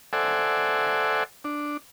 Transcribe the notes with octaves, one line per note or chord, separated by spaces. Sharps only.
A4 C5 D5 E5 F#5 G#5
D4